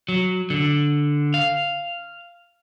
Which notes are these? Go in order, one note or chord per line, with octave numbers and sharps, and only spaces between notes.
F#3
D3
F5